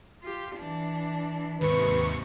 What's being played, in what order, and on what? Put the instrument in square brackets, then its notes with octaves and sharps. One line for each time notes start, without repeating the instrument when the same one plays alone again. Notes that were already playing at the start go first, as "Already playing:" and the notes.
[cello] F4 G4
E3 D4
[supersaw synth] D#2 C#6 [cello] G#2 C3 [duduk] B4